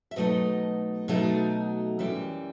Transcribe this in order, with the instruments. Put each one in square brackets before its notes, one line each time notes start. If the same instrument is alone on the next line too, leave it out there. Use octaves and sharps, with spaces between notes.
[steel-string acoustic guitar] E5
B2 F#3 A3 D#4 D#5
B2 F#3 A3 D#4
F#2 E3 G3 E5